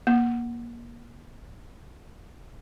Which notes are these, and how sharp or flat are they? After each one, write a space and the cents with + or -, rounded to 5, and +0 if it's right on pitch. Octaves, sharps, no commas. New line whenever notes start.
A#3 +20